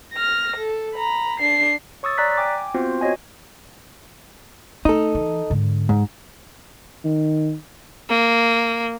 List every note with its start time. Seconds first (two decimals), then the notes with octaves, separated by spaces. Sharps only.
0.14 F6 A#6
0.56 A4
0.95 A#5 B5
1.40 D4 C7
2.03 C#5 C#6 D#6 E6 A6
2.18 D5 A#5 F#6 B6
2.37 G5 G#5 D6
2.74 B3 C4 F4 F#4 C5
3.01 F#4 C#5 D#5 G#5
4.85 A3 D#4 A4
5.15 E3
5.50 G#2 D3
5.89 G#2
7.04 D#3
8.09 A#3